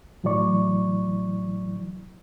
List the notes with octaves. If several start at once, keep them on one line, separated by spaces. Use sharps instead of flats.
A2 E3 F#3 E4 D5 C#6